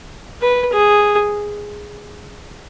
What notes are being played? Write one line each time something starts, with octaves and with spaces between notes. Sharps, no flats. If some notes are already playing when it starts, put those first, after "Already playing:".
B4
G#4